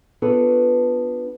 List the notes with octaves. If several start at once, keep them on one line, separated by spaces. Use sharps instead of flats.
B3 D4 F4 A4 B4 C#5